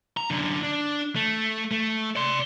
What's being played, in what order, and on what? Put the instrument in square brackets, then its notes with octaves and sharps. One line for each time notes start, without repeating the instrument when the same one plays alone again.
[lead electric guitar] A#5
F#2 D3
D4
A3
A3
D5 C6